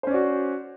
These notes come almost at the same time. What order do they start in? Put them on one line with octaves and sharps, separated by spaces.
C5 C#4 D5 F#4